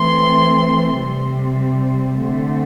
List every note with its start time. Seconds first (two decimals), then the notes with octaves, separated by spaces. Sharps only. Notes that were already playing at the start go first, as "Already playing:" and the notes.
Already playing: E3 A3 C4 C6
0.98 C3 G3 C4
2.22 D3 A3 C4